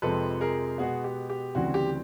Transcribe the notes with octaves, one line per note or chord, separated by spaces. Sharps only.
F2 C3 F3 G#3 C4 A4 B4
G#4 A#4
B2 G#3 B3 F#4 G#4
G4
G4
D2 C#3 E3 G3 C4 F#4
G4